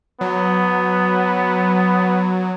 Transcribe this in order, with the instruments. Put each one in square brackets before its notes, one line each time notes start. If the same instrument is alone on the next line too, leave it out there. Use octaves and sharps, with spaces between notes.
[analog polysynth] F#3 [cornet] B3